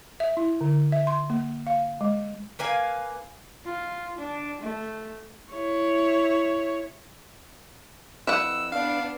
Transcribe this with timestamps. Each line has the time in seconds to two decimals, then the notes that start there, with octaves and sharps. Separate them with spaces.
0.20 E5
0.37 E4
0.61 D3
0.92 E5
1.07 C6
1.30 A#3
1.67 F5
2.01 G#3
2.59 A#3 B4 F5 G#5
3.65 F4
4.18 D4
4.61 A3
5.53 E4 C#5
8.27 F2 E4 B4 F#5 E6
8.72 B3 D4 F5